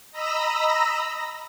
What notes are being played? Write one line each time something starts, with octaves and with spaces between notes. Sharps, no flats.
D#5 A#5 B5 E6 A#6